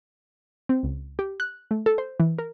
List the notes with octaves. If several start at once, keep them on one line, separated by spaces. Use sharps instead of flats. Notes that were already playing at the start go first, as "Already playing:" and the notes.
C4
C#2
G4
F#6
A3
A4
C5
E3
A#4